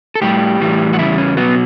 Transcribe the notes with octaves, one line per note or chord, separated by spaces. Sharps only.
A4
A2 G3 G4
A2 E3 G3
F#4
E2 C#3 G3 E4
C#4
B2 F#3 B3